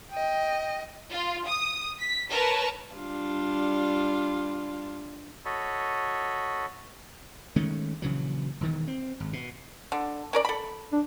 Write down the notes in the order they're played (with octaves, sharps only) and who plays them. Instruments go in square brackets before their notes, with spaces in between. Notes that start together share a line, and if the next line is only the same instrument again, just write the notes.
[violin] D#5 G5
[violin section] F4
D#6
B6
A#4 B4 C#5 A5
[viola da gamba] G3 D4 F4
[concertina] F#4 A4 C#5 D#5 B5
[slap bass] D#3 G#3 A3 C#4
A#1 C#3 E3 F#3
E1 D#3 E3
C4
G#1
B2
[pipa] D3
C#4 A#4 D5
A4 B5
[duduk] D4